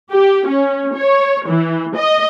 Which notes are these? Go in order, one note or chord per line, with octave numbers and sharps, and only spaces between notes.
G4
C#4
C#5
E3
D#5